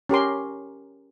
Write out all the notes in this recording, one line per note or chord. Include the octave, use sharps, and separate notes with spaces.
C#4 G4 A#4 C6